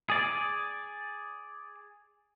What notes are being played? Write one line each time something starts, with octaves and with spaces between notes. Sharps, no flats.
G#4 D5